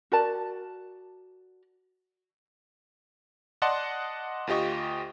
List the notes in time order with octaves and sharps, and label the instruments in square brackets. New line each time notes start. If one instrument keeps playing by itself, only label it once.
[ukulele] F#4 A#4 D5 A5
[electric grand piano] D5 D#5 F#5 A5 C6
D2 F4 G4 D#5 C#6